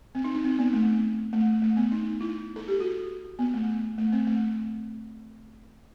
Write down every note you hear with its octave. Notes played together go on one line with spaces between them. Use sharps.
C4
D#4
D#4
C4
B3
A3
A3
A3
B3
D#4
E4
A4
G4
F#4
B3
A3
A3
C4
A3